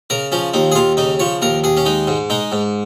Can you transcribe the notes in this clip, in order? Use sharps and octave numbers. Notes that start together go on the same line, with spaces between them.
C#3 A#4
F3 C#4
D#2 D#4
G#4
D#2 F4
C#3 D#4
F3 C#5
D#2 A#4
D#2 G#4
C#4
G#3 D#4
G#2
G#3 D#4
G#2